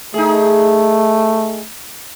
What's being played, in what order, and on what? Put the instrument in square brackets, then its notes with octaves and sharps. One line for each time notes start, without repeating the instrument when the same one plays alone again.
[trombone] A3 [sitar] D#4 G#4